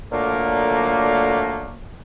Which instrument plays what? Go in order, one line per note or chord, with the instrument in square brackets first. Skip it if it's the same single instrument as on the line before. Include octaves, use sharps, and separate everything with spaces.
[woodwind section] A#2 D3 F#3 A3 A#3